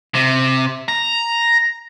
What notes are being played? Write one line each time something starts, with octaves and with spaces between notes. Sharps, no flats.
C3
A#5